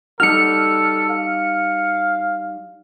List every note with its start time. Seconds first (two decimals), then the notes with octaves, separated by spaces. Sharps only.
0.20 G3 D#4 F#4 A4 F6 C#7
1.09 F5